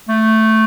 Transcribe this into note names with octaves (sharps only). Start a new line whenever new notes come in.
A3